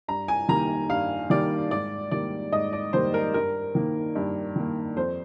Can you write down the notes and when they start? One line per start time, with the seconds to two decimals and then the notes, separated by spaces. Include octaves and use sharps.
0.08 G2 A#5
0.28 G#5
0.48 D#3 G3 A#3 A#5
0.90 G2 F5
1.30 D#3 G3 A#3 D5
1.71 G#2 D5
2.11 D#3 G3 A#3 D5
2.52 G#2 D#5
2.73 D5
2.93 D#3 G3 A#3 C5
3.14 A#4
3.34 G2 A#4
3.75 D#3 A#3
4.15 G2
4.56 D#3 A#3
4.96 F2 C5